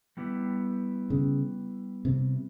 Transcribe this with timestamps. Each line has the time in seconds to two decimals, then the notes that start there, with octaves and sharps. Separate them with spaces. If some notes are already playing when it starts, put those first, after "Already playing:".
0.17 G3 B3 E4 G4
1.10 C#3
2.05 C3